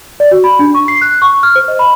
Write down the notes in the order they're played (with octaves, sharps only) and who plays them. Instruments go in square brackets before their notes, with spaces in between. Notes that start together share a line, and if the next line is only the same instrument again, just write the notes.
[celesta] D5
F#4
B5
D4
C#6
C7
F#6
C#6
F6
C5
D#5
B5